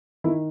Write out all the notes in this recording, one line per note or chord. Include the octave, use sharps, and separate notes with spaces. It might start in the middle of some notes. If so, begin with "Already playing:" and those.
D#3 E4